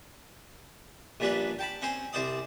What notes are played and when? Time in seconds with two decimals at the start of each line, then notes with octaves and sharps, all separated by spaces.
1.20 A#1 A#2 G3 C#4 D4 B4
1.59 G5 A5 B5
1.82 C4 C#4 C5 G#5
2.13 C2 C4 C5 D5 D#6